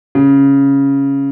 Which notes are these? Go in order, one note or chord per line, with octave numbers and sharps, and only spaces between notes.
C#3